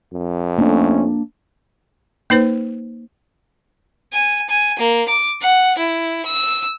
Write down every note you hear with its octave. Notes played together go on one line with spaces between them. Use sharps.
F2
A3 A#3 C#4 D4
A#3 D#4 B4 C5
G#5
G#5
A#3
D6
F#5
E4
E6